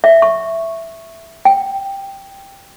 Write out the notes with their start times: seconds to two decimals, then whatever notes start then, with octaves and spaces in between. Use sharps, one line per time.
0.04 E5
0.22 C#6
1.45 G5